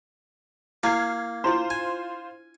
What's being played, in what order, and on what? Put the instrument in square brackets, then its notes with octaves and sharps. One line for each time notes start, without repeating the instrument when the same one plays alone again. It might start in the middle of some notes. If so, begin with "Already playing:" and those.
[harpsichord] A#3 [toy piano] E4 [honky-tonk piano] F6 G#6 C7
[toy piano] D4 E4 C6 [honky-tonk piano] F4 C5
[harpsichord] G#5